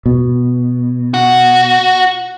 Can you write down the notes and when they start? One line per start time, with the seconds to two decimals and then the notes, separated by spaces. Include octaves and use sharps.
0.06 B2
1.14 F#4